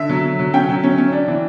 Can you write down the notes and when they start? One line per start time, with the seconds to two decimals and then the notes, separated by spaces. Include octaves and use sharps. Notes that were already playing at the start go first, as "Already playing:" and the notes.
Already playing: D3 E5
0.09 F#3
0.24 F#3
0.39 F#3
0.53 C#4 G5
0.69 F#3
0.83 C#4
0.98 C#4
1.12 D4
1.28 E3